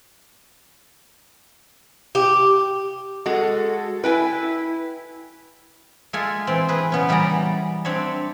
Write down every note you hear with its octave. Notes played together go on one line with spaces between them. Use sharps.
G4
G#3 F#4 A4
E4 B4 G5 G#5
G#3 F4 A4 E5 G#5
E3 C4
G#4 B4
C#3 B3 C#4
E3 G3 B3 D5 A#5
C4 D4 C#5 E5